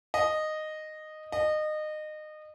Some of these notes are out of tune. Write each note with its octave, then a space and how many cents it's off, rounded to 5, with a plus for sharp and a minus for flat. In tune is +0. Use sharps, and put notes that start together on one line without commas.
D#5 -10
D#5 -25